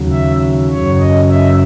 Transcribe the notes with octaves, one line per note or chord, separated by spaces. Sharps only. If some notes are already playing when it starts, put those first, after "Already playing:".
Already playing: D#2 C#3 F#3
E5
F#2 C#3 F#3 C#5
D#5
E5